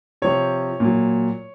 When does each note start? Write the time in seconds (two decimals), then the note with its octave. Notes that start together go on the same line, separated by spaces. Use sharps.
0.22 C3 F3 C#5
0.80 A#2 F#3